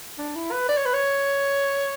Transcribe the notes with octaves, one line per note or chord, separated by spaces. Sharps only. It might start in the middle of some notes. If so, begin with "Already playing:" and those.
D4
E4
B4
D5
C#5
B4
C#5